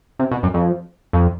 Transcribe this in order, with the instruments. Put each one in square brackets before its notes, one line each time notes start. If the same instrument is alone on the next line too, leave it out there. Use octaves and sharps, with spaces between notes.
[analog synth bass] C3
B2
F#2
F2
F2